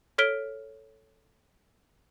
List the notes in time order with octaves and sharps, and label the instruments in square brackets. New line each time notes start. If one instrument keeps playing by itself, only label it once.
[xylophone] A4 C#5 F6 B6 D7 G7